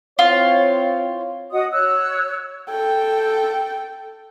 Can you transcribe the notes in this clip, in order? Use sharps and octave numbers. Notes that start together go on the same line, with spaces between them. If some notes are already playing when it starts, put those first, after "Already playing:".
C4 E4 F4 C#5
F#4 D#5 F#5 D#6
C#5 E6 F#6
A4 G5